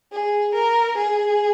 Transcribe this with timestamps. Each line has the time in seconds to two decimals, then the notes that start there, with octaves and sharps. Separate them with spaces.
0.12 G#4
0.54 A#4
0.97 G#4